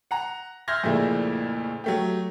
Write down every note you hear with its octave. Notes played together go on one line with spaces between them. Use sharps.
F#5 A#5
E5 C6 F6 G6 G#6 A#6
F2 A#2 C#3 A3 D4 E4
F#3 A3 G4